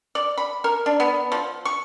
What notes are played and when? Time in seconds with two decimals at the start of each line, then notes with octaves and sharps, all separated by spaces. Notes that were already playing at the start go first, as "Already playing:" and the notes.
0.15 D5
0.38 B5
0.64 A#4
0.86 D4
1.00 B3
1.32 F3
1.65 C#6